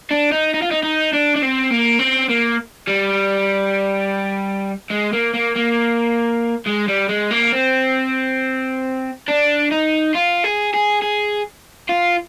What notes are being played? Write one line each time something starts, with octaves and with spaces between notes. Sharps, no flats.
D4
D#4
D#4
F4
D#4
D#4
D4
D4
C4
A#3
C4
A#3
G3
G#3
A#3
A#3
A#3
G#3
G3
G#3
A#3
C4
D4
D#4
F4
G#4
G#4
G#4
F4